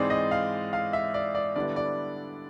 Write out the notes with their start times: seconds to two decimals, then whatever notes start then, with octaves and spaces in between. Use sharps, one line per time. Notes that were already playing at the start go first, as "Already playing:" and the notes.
Already playing: G#2 E3 G#3 C4 D#4 D5
0.10 D#5
0.31 F5
0.73 F5
0.93 E5
1.14 D5
1.35 D5
1.56 D3 G3 B3 E4 D5
1.76 D5